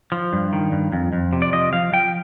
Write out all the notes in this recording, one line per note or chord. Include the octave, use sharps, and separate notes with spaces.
F3
G2
D#3
G2
F2
F2
C3
D5
F3 D#5
F3 F5
F3 G5